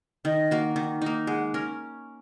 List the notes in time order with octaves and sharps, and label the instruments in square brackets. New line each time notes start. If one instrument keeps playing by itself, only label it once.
[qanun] D#3 [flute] D#5
[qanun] A#3 F#4
D#3
A#3 D#4
[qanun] G#3 [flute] F#5
[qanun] C#4 A#4